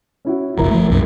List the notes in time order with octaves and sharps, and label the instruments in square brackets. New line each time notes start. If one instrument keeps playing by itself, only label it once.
[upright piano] C#4 E4 F#4
[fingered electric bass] F#1 B1 F2 [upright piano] E4 A#4 A#5
[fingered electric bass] F3 A3
B1 F#2 A#2